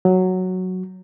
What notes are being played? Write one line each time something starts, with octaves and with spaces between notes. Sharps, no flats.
F#3